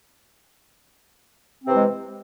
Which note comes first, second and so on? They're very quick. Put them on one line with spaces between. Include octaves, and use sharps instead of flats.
C4 C3 E3 G#3